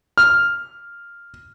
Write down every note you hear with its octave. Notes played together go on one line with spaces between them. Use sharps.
F6